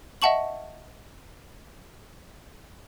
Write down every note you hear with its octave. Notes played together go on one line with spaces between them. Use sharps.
D#5 E5 F#5 A5 C#6 F#7